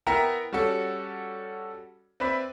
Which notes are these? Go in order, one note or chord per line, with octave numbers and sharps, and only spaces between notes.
B3 E4 A#4 E5 G5 A#5
G3 C#4 F#4 A4
C4 B4 D5 E5 B5